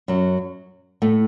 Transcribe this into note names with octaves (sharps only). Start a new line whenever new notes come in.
F#2 F#3
A2 A3